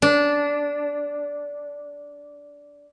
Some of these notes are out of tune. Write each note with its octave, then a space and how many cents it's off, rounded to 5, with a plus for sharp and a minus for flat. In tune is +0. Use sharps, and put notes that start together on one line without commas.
D4 -15